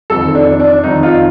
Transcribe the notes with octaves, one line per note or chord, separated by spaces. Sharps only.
F2 D#3 A4
D4
D4
F2 D#3 D#4
F4